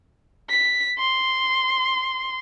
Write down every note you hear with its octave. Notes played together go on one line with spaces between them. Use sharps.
B6
C6